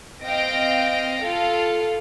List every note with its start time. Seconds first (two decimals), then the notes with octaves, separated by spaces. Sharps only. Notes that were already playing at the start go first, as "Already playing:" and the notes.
0.23 C4 D#5 F5 G5 A#6 D7
1.22 F4 A4 F5